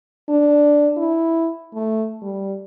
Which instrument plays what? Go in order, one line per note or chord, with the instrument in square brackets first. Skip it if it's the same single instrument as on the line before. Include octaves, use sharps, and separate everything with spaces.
[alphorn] D4
E4
A3
G3